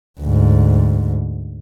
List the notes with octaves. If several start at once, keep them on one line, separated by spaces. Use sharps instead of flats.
D2 G#2